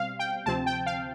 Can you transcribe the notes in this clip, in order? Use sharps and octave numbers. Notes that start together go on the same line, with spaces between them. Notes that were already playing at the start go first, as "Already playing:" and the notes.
Already playing: B2 G3 C4 F5
G5
D2 C3 F3 C4 A5
G5
F5